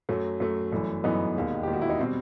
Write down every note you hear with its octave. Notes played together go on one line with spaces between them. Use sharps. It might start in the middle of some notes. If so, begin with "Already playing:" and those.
F#2 F#3 A3
F#2 F#3 A3
G1 F#2 E3 A3
G1 F#2 E3 A3 B3 D#4
E1 D#2 D#3
E1 D#2 D#3 G4
F#4
E4
D#4
B2 G3 C4